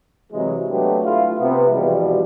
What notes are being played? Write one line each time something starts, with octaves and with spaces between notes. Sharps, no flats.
C3 E3 F#3 G#3
F#3 A3 B3 D4 G4
A3 E4 F4
C3 B3
E2 G#2 B2 F3 G3